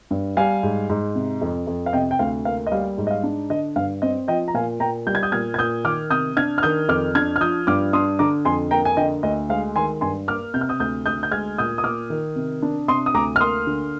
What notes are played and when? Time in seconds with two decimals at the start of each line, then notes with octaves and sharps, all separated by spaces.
0.11 G2
0.37 G3 F5 G#5
0.63 G#2
0.90 G#2
1.15 C3
1.41 F2
1.67 F2
1.86 F5
1.93 C3 D#5 G5
2.11 G5
2.19 D2 F5
2.45 A#3 F5
2.67 D#5
2.72 G3 F5
2.98 G#2
3.07 D#5
3.11 F5
3.23 D4
3.50 D3 D#5
3.76 G2 F5
4.02 C4 D#5
4.28 F3 D#5 G5
4.48 A#5
4.54 A#2 F5 G#5
4.80 A#2 G5 A#5
5.07 G3 G6
5.15 G#6
5.23 D#6 G6
5.32 A#2 F6 G#6
5.54 G#6
5.58 A#2 D#6 G6
5.85 D#3 D6 F6
6.10 C3 D#6 G6
6.37 D4 F6 G#6
6.58 F6
6.62 D#3 D#6 G6
6.88 F2 D6 F6
7.15 D4 F6 G#6
7.36 F6
7.41 F3 D#6 G6
7.67 G2 D6 F6
7.93 D4 C6 D#6
8.19 D3 A#5 D6
8.45 F2 G#5 C6
8.71 A#3 G5 A#5
8.85 G#5
8.97 D3 D#5 G5
9.23 D2 D#5
9.49 G#3 F5
9.76 D#3 G#5 C6
10.01 G2 G#5 C6
10.28 A#3 D6 F6
10.54 C3 G6
10.61 F6
10.69 D#6 G6
10.80 D2 D#6 G6
11.06 D2 D#6 G6
11.23 G6
11.31 G#3 F6 G#6
11.58 A#2 D#6 G6
11.78 D#6
11.84 A#2 D6 F6
12.10 D#3
12.36 C3
12.63 D4
12.88 C3 C6 D#6
13.06 D#6
13.14 D2 A#5 D6
13.36 F6
13.40 A#3 C6 D#6
13.67 D3